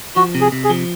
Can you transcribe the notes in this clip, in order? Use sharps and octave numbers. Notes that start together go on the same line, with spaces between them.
F3 F#4
C3
G#4
C3
G#4
F3